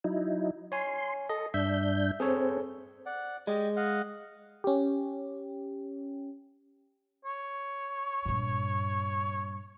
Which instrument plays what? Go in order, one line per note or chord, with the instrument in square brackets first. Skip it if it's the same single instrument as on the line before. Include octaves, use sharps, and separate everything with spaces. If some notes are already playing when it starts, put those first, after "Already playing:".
[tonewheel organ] F#3 D#4 E4
[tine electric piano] C#5 G#5 [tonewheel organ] C6
[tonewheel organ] A4 [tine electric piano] D#5
[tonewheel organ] G2 D4 G6 [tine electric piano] E5
[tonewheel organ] C4 [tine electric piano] G#4 A4 C#5
[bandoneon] D5 F#5
[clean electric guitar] G#3 [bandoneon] G4 D5 D#5
[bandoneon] D#5 F5 F#5
[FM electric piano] C#4 G4
[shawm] C#5
[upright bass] G2 A#2